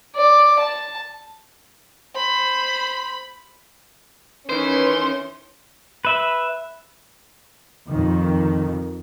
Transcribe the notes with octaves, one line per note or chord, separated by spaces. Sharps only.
D5
A5
C5 B5
D#3 E3 C#4 B4 C5
B4 E5
F2 D#3